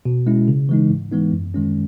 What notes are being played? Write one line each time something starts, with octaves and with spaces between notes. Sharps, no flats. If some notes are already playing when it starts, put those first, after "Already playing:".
B2
G#3 C#4 E4
C#3
E3 G#3 D#4
G#2
E3 G#3 B3 D#4
F#2
D#3 G#3 C#4